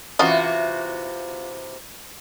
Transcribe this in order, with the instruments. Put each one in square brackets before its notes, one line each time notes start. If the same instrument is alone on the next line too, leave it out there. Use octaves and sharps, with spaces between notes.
[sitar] C3 E3 F#4 [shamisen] F#3 C#4 D#5 [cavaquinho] F4